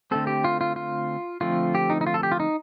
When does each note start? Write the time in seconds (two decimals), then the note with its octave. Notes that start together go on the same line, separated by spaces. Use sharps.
0.11 D3 A3 C4 A4
0.27 G4
0.44 F4
0.61 F4
0.76 F4
1.41 D3 F3 A3 C4 F4
1.75 G4
1.90 D#4
2.01 D#4
2.07 F4
2.14 A4
2.23 G4
2.32 F4
2.40 D#4